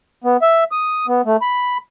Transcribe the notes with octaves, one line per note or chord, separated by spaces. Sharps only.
B3
E5
D#6
B3
A3
B5